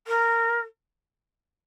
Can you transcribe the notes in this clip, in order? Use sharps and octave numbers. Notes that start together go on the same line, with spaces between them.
A#4